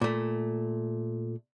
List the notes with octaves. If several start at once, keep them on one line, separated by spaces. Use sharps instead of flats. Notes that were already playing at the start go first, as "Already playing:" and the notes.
A#2 A3